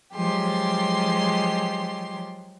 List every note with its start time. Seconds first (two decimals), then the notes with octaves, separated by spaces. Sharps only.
0.15 F3 F#3 G#3 G4 C6